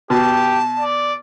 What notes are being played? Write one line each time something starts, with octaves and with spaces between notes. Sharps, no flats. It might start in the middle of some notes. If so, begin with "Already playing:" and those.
B2 G4 A5
D5